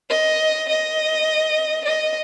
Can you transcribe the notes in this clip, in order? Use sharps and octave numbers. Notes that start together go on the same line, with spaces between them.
D#5
D#5
D#5